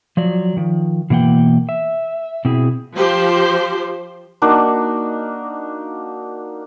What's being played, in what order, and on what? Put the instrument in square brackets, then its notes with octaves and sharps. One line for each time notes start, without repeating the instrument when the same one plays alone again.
[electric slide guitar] F3 F#3 D5
D#3 F3
B2 E3 A#3 F#5 G5
E5
B2 C4 E4 G#4
[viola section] F3 G4 C5
[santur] A#3 D4 D#4 F#4